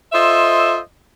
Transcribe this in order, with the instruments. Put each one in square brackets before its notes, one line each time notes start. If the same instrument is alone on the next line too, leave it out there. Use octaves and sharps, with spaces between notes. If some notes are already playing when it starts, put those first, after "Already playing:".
[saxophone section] F4 A4 C5 D#5 E5